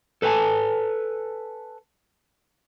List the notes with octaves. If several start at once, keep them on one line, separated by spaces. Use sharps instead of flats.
A4 B4 F#5 G#5 A5